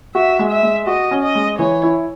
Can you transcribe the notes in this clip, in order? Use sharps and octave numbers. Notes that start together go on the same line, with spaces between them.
F#4 E5
G#3
E5
G#3
F#4 D#5
C#4
D#5
G#3
E3 C#5
E4